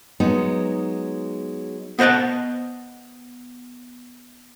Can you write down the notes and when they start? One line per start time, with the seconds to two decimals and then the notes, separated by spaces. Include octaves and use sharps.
0.20 F#3 G#3 B3 D#4
1.99 B3 C5 D#5 F#5 A5